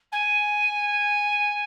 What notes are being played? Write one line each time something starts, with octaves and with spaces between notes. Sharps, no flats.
G#5